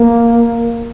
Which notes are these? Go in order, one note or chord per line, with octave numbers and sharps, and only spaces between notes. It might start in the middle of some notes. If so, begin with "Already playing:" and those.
Already playing: A#3